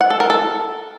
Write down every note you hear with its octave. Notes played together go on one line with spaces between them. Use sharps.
F#5
A4
A#4
A4